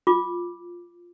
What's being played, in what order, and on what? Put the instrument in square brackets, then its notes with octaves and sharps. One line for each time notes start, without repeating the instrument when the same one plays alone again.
[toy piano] F4 D6